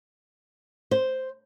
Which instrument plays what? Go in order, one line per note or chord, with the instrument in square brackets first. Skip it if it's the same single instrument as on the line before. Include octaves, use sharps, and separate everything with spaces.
[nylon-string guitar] C5